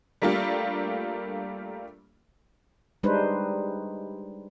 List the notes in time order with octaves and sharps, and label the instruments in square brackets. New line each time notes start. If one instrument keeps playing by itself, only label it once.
[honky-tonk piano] G3 A3 A#3 D4 F4 G4
[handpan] G3 G#3 D4 D#4 B4 C5